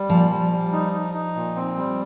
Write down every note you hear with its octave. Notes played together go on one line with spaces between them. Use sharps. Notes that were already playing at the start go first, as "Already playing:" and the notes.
Already playing: G3
A#2 F3
G3
G3
D#4
D#4
D#4
A#2
C4
G3